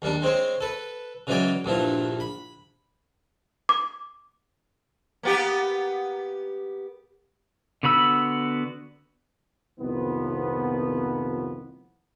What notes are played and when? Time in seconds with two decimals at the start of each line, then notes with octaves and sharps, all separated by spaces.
0.02 D#2 G3 D4
0.22 G#3 C4 C5 C#5
0.61 A4 B4
1.27 C#3 E3 F#3 G#3 D5 G5
1.65 A#1 G2 F3 E4
2.20 B5
3.69 D6
5.23 A#3 B3 G4
7.83 D3 B3 F#4 B5 E6
9.80 C2 F2 A#2 D#3 F3 B3